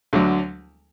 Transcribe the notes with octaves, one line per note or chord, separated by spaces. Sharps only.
D2 D3 F#3